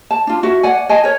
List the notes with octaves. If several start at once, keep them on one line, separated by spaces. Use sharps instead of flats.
A5
D4 F4
E4 F#4 E5
D5 F#5 G#5
D#5 G#5 A5
A#4 C#5